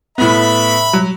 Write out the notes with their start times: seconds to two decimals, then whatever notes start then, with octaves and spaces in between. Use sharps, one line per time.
0.18 A2 B3 E5 B5
0.93 F#3